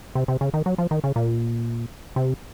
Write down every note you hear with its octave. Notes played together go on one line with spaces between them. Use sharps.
C3
C3
C#3
D#3
F#3
F3
D#3
C#3
A#2
C3